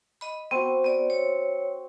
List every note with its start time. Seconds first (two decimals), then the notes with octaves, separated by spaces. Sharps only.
0.21 D#5 B5
0.51 B3 C4 F#4
0.84 B3 D5
1.10 C#5